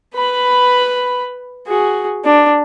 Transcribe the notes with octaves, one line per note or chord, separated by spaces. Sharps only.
B4 B5
F#4 G#4
D4